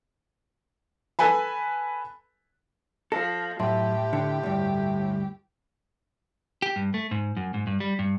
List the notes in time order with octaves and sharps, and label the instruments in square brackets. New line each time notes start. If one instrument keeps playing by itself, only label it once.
[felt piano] A4 B4 G#5 B5
[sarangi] F3 [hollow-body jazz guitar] A4 [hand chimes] A#6
[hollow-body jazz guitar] F#2 [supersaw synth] A2 [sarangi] G4 [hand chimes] E5 A5 C6
[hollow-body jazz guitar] D3
D2 G2
[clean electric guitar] G4
G2
A3
G#2
F#2
G#2
G2
G3
G2